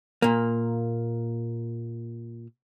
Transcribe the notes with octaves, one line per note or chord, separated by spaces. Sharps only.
A#2 A#3